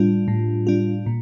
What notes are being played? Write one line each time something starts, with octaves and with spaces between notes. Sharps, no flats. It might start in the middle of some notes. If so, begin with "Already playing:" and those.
Already playing: A2 G3 D4 F4
A2
G3 D4 F4
A#2